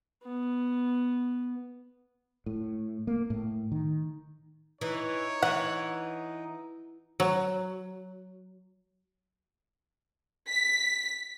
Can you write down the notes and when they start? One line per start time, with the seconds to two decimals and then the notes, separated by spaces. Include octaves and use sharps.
0.23 B3
2.46 A2
3.07 A#3
3.30 A2
3.72 D#3
4.81 E3 D#4 C#5
5.43 E3 F#5
7.20 F#3
10.49 B6